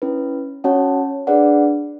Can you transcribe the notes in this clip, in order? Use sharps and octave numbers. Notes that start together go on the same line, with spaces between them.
C#4 E4 B4
C#4 F#4 C#5 F#5 A5
D4 G#4 B4 D5 F#5